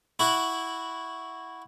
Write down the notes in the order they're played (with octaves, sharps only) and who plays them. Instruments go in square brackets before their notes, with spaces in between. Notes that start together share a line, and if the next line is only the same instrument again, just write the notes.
[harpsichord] E4 F#4